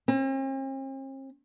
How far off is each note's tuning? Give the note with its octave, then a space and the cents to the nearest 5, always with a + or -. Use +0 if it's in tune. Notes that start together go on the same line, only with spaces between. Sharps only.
C4 +45